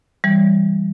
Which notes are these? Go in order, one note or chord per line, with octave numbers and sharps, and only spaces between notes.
E3 G3